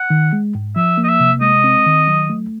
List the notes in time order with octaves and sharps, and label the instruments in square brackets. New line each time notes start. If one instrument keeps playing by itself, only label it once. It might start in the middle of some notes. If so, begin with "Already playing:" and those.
Already playing: [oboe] F#5
[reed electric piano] D#3
G#3
G#2
[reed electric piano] F3 [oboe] E5
[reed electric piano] A#3
[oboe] D#5
E5
[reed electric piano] C3
[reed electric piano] G#3 [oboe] D#5
[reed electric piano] C4
D#3
F#3
A3